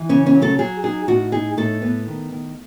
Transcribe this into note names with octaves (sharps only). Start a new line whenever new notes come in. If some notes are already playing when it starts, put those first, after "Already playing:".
Already playing: E3
C#3 C#4 C#5
C#4 C#5
F#3
A3 A4
F#3 G#4
D#4 G#4
A2 F#4
D#4 G#4
A2 A3 A4
B3
D#3
D#3